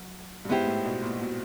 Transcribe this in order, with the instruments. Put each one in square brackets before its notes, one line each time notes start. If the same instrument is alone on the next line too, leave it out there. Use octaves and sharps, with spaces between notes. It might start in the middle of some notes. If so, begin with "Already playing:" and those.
Already playing: [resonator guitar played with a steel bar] F#3
[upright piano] G2
[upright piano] G#2 [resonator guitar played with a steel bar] B3 E4 G4 C5
[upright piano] A2
B2
A#2
B2